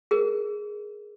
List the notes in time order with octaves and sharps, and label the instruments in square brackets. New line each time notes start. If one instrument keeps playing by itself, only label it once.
[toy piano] G#4 A#4